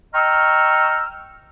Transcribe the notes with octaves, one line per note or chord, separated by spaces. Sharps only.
D#5 G5 A#5 C#6 E6 F6